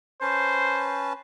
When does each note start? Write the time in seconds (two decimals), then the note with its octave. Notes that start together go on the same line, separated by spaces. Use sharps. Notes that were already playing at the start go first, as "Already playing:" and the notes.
0.22 C#4 B4 C5 A5